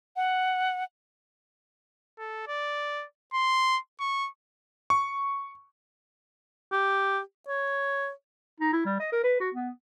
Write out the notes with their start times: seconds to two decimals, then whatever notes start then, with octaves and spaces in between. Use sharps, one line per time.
0.16 F#5
2.19 A4
2.48 D5
3.34 C6
4.00 C#6
4.90 C#6
6.72 G4
7.48 C#5
8.60 D#4
8.73 E4
8.85 G3
9.00 D#5
9.12 A#4
9.24 B4
9.40 F#4
9.55 B3